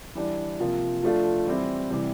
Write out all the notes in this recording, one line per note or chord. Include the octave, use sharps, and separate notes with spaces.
E3 G3 D4
C3 F3 A#3 F4
F3 A3 D4 F4
E3 G3 C4 E4
C3 E3 G3